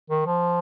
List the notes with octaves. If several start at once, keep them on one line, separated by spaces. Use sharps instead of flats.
D#3
F3